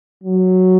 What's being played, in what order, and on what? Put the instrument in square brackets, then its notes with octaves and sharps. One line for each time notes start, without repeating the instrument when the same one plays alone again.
[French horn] F#3